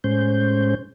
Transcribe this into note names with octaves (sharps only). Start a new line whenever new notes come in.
A2 G#3 C#4 C5 G6